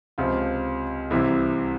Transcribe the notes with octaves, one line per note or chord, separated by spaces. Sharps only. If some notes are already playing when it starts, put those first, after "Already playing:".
C#2 C3 F3 F4
C2 C3 E3 E4